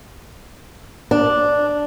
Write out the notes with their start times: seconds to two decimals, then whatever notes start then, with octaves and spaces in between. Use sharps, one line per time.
1.11 D4